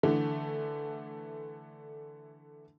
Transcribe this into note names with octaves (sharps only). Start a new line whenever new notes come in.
D3 E3 A3